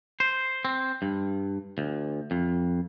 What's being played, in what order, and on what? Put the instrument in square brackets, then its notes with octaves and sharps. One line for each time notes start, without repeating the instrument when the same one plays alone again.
[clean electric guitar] C5
C4
G2
D2
F2